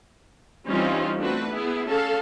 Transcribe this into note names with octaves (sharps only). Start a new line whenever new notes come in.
E3 G3 C4 C#4 D#4 F4
A3 C4 D4 F#4 B4
B3 E4 G#4
C#4 G#4 A4 F5 A5